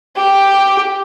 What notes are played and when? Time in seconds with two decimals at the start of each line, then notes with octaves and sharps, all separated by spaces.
0.16 G4